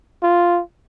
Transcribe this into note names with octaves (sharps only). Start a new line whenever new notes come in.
F4